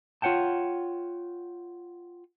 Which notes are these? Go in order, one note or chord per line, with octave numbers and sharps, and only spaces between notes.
F4 C#5 F#5 G5 A5